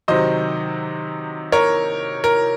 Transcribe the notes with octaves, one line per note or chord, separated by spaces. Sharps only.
C3 D#3 F#3 C5 D#5
A#4 C#5
A#4